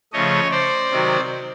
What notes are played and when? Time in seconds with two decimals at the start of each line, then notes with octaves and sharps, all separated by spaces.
0.13 C#3 F3 A3 C#5 D#5
0.51 C5 D5
0.90 C3 D#3 F#3